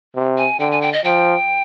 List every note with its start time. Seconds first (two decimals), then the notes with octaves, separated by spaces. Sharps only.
0.16 C3
0.38 G#5
0.60 D3 G5
0.71 G#5
0.82 G5
0.93 D#5
1.04 F3 G5